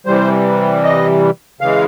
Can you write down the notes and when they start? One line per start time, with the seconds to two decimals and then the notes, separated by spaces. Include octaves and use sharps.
0.06 C3 E3 G3 C5
0.84 D#5
1.61 C#3 E3 G#3 F5